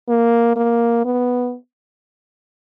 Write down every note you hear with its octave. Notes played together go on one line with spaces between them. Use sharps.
A#3
A#3
B3